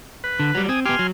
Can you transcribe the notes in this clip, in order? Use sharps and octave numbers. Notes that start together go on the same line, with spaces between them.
B4
D3
F#3 G3
C4 G#5 D#6
B3 G4 G#5 C6 F6
F#3